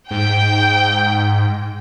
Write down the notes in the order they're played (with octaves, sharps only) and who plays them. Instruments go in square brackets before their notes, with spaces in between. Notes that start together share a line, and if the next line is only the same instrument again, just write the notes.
[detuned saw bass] G#2 [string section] G5